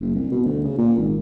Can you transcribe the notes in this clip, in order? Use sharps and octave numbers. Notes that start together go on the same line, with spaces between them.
F#1
C2
B2
D2
C#3
A#2
G#1